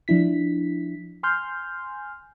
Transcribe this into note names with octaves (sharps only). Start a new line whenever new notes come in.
F3 D4 E4 B6
G#5 C6 F6 G6